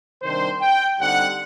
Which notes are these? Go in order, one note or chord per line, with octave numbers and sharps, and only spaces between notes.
C3 D#3 G3 D4 C5
G5
D3 G3 C4 D#4 F#5